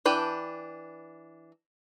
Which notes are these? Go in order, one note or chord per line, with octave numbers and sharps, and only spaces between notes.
E3 D4 B4 G5